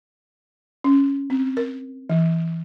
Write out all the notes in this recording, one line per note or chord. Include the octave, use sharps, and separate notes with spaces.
C#4
C4
A#4
E3